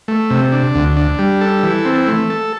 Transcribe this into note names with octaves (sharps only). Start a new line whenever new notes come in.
A3
C3
D4
D2
D4
G3
A4
E3
C4
A3
A4